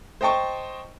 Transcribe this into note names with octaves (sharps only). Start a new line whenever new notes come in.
C5 D#5 G5 A5 C#6